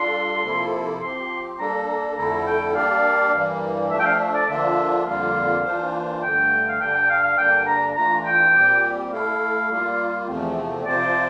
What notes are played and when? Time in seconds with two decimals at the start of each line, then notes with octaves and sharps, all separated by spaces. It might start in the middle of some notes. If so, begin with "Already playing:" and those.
Already playing: G3 D4 F4 A4 C6
0.43 C3 F3 A#3 E4 A4
1.01 F3 C4 G4 C6
1.59 G3 A#3 D4 A4 A#5
1.88 A#5
2.17 F2 D3 A3 E4 A4 A#5
2.46 G5
2.74 G3 A#3 D4 G4 D5 F5
3.33 G2 E3 G3 A#3
3.90 F3 A3 D4 E5
3.99 G5
4.05 F5
4.20 E5
4.34 D5
4.48 D3 F3 A#3 D4 F4 E5
5.06 F2 D3 G3 A#3 F4 F5
5.64 E3 A#3 D4 F4 C5
6.22 G2 D3 A3 G5
6.69 F5
6.80 G2 D3 G3 D4 G5
6.94 G5
7.09 F5
7.23 F5
7.38 G2 D3 G3 A#3 D4 G5
7.67 A#5
7.96 E3 A3 D4 F4 A#5
8.25 G5
8.54 A#2 G3 C4 G4
9.12 A3 E4 A4 F5
9.70 G3 A#3 F4
10.27 E2 C3 F3 A3 C4
10.85 C3 F3 C4 F4 C5 D5